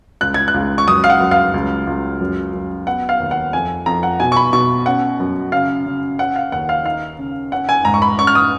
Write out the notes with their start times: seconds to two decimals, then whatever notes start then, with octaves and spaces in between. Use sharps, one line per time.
0.21 C#2 F#6
0.34 G#6
0.48 F#6
0.54 C#2
0.78 C#6
0.87 F#2 D#6
1.04 F5
1.10 F#5
1.20 F#2
1.31 F5
1.54 C#2
1.87 C#2
2.20 F#2
2.53 F#2
2.87 B3 F#5
3.09 F5
3.20 D#2
3.31 F#5
3.53 F2 G#5
3.86 F2 A#5
4.03 F#5
4.20 B2 G#5
4.32 C#6
4.37 B5
4.53 B2 C#6
4.86 C#4 F#5
5.20 F#2
5.52 C#3 F5
5.86 C#3
6.19 C#4 F#5
6.36 F5
6.52 D#2 F#5
6.69 F5
6.85 D#4 F5
7.19 C#3
7.52 C#4 F#5
7.69 G#5
7.85 G#2 A#5
7.94 C#6
8.02 B5
8.18 C#4 C#6
8.27 F6
8.35 D#6